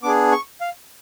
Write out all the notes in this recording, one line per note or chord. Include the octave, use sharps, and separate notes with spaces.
B3 D4 G#4 D6
C#6
F5